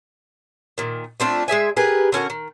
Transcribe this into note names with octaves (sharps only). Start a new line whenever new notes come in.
A#2 D#3
A3 C4 D4 F4
G#3 G#4 E5 G#5
G4 G#4 A#4 B4
D3 C#4 F#4 A#4
D#3